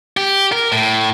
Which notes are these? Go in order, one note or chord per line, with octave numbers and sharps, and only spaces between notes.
G4
A#4
A2